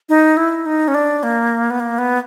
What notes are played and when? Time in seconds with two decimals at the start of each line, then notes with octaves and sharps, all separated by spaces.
0.09 D#4
0.37 E4
0.66 D#4
0.88 C#4
0.94 D4
1.23 A#3
1.70 B3
1.80 A#3
1.98 B3